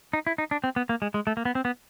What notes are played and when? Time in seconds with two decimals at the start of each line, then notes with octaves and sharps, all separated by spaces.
0.13 D#4
0.27 E4
0.38 D#4
0.51 D4
0.64 C4
0.76 B3
0.89 A#3
1.02 G#3
1.14 G#3
1.27 A3
1.37 A#3
1.45 B3
1.55 C4
1.65 B3